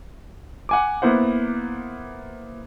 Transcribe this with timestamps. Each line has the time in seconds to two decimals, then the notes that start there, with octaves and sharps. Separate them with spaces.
0.69 F#5 G#5 D6
1.02 A#3 B3 E4 C5 F#5